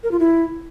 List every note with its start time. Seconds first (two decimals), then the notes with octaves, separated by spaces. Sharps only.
0.03 A#4
0.11 F4
0.19 E4